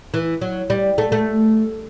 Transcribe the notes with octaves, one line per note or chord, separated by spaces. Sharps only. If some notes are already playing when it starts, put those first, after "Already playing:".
E3
F#3
G3
A3
A3